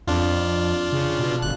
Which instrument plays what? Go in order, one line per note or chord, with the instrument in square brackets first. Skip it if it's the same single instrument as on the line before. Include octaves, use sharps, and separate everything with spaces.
[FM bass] F2 [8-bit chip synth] D4 F4
[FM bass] C#3
B2
[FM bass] G1 [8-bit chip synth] F#6